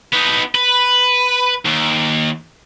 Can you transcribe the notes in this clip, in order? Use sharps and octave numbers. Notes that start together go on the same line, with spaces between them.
B3 D#4
B4
D#2